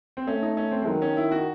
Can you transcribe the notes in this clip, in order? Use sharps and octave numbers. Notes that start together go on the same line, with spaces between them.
C4
A3 C#4
D#4
C#4
C4
G#3
D#3 F#3
C#4
E4
F#4